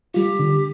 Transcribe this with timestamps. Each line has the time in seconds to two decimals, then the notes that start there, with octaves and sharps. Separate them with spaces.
0.14 G3 F4 G4
0.39 D3